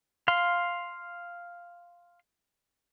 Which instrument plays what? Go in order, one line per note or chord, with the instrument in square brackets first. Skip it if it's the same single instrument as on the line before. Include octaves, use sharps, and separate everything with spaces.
[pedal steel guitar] F5 C6